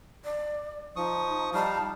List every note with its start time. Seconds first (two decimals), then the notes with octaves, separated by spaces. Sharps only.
0.25 D5
0.96 F3 D#4 C#6 D#6
1.54 G3 D#4 F5 A5